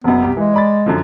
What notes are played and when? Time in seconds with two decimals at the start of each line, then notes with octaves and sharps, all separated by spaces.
0.04 F#1 F#2 B3
0.22 C2 G4
0.37 E3 G#3
0.54 D5 B5 A6
0.86 F#2 D3 F3